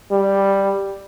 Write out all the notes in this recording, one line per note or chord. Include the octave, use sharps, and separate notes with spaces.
G3